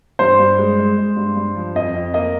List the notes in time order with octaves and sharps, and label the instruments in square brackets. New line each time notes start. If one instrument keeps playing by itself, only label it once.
[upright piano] G2 [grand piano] C5
[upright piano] G2
G#3
G#3
G#3
G2
G2
F3
[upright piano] F2 [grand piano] D#5
[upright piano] F2
[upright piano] A#3 [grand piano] D#5